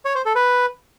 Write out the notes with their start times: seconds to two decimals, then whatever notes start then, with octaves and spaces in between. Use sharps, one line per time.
0.05 C#5
0.15 C5
0.25 A4
0.36 B4